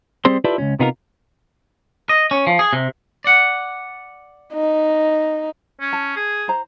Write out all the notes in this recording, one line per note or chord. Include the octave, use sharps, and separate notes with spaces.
G3 C4 G#4 C5 C6
E4 F4 G4 A4 B4 D5
C#2 F#2 C#4
C3 B3 D#4 F4 G4 A#4
D#5
C#4
F3
G#4
C3
D5 F#5
D#4
C#4
A5
G#4
C5 A#5